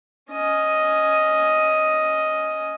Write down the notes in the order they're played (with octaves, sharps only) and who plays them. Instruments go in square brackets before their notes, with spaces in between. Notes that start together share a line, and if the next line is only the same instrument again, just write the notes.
[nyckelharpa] C#4 D#5